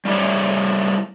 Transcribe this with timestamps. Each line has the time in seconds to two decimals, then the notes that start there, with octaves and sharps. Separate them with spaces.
0.05 G3 A3 E4 G4 C#5